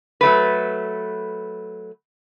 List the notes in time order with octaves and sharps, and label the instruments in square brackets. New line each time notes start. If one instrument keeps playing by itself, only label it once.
[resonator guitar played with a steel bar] F#3 A3 B4